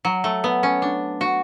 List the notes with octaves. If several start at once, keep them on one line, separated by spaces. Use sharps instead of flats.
F#3
A3
B3
C#4
D4
F#4